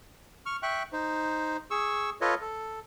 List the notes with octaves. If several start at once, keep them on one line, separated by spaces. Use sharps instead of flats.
C#6 F6
E5 G5 C#6 F#6
D#4 C5
G#4 C#6 E6
F4 A4 B4 C#5 D#5
A4